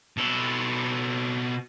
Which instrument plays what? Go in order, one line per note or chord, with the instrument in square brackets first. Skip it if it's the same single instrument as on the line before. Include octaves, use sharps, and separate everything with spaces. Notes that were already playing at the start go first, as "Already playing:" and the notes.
[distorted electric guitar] B2 A4